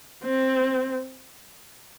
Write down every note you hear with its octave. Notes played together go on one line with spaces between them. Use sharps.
C4